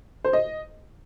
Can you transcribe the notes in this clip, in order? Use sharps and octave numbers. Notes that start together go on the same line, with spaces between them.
C5
D#5